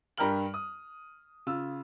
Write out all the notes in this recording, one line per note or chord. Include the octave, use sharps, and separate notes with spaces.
G2 G3 A#4 G5 F6 F#7
D#6
C#3 F4 E6